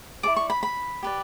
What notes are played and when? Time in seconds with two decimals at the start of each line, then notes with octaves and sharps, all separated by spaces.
0.23 E4 A4 D5 D6
0.36 C#6
0.50 B5
0.63 B5
1.03 G4 B4 D5